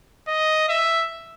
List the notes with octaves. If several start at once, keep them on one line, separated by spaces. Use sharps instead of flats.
D#5
E5